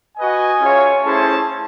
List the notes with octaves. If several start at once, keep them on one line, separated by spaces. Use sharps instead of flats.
F#4 B4 D#5 G#5
C#4 F4 G#4 C#5 E5
A3 C#4 E4 G#4 C5 A5